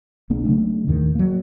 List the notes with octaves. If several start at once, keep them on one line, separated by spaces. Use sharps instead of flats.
B1 A#3 B3 D4
C#3 F#3 A3 D4
D#2 A2 D#3
F#3 A#3